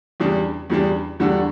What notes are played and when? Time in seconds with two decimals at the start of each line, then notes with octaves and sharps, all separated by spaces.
0.20 E2 C#3 G3 D4
0.70 E2 C#3 G3 D4
1.20 E2 D3 G3 D4 F#4